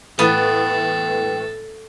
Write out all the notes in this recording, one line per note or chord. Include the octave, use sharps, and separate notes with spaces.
A2 E3 A3 B3 A4 B4 G5